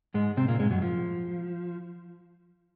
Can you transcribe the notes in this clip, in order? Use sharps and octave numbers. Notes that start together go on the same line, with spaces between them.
G#2 G#3
C3 C4
A#2 A#3
G#2 G#3
F#2 F#3
F3